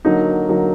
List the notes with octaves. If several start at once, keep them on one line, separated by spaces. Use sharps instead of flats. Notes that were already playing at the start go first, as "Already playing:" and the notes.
D3 F#3 A#3 D#4
D3 F#3 A#3 D#4